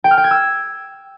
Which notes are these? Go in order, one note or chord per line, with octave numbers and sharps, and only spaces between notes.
G5
F6
G5
G#6
E6